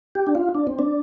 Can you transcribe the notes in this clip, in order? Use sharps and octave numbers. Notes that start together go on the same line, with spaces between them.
G4
D4
F4
D4
C4
D4